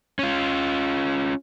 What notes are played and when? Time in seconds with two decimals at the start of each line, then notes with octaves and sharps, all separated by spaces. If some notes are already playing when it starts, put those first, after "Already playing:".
0.19 C#4 F4